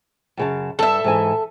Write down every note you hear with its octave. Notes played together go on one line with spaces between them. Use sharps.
F#2 C#3 A5
G2 A4 E5
G#2 E3 G#5